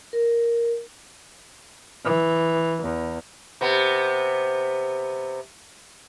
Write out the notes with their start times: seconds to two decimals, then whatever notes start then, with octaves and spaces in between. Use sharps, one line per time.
0.13 A#4
2.05 E3
2.82 E2
3.61 C3 B3